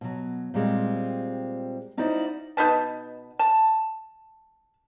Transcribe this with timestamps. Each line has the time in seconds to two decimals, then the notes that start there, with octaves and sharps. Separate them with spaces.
0.01 B2 F#3
0.54 A#2 G3 G#3 C4
1.97 C#4 D#4 E4 F#4 C5 D5
2.57 B2 D#4 B4 A5
3.39 A5